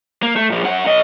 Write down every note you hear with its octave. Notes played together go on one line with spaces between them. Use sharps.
A#3
A3
A#2 F3
F#2 F#5
B1 D#5